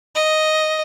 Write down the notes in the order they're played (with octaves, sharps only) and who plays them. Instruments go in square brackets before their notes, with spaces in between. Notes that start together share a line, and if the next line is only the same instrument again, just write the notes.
[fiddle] D#5